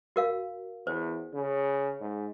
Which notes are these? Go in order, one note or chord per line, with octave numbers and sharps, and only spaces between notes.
F#4 A#4 F5
E2 C5
C#3
G#2